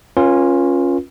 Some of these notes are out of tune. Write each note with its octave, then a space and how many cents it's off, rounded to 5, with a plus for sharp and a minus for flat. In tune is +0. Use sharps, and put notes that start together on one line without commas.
C#4 -15 F4 +0 A#4 +45